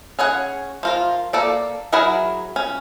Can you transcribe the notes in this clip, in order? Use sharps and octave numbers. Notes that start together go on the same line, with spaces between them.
C#4 G#4 C#5 F#5
F3 F4 A#4
A#3 A4 D5
F#3 E4 G#4 A#4 F#5
C#4